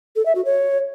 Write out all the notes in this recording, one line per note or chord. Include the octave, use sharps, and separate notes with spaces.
A4
E5
F#4
C#5